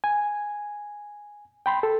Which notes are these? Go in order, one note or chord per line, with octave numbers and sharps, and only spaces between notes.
G#5
G5 B5 C6
A4